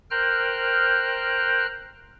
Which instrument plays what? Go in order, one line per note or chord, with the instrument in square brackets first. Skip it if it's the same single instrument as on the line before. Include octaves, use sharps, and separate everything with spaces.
[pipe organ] A#4 C5 G5 F6 F#6